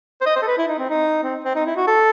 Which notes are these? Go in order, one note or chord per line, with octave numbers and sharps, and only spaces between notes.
C5
D#5
C5
A4
B4
E4
D#4
C4
D#4
C4
C4
D#4
E4
F#4
A4